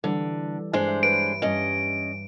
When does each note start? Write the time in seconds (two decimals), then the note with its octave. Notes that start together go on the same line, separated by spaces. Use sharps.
0.04 D3 E3 G3
0.73 G2 G#3 D4 C5
0.87 E5
1.03 B4 C#5 D7
1.42 G2 C#4 G4 D#5